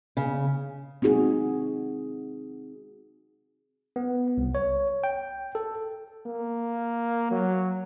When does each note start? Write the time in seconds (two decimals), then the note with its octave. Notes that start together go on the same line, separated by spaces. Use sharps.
0.17 C#3
1.02 C4 D#4 F#4 G#4
3.96 B3
4.38 C2
4.55 C#5
5.04 G5
5.55 A4
6.27 A#3
7.31 F#3